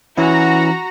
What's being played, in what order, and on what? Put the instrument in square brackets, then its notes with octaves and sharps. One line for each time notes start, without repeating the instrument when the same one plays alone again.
[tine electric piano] E3 C#4 E4 [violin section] F#4 A#5